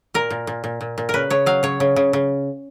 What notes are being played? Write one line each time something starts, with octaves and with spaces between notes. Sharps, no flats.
A#2 A#4
A#2
A#2
A#2
A#2
A#2
C#3 A#4 B4
C#3 C#5
F#3 F5
C#3 C#5
C#3
C#3
C#3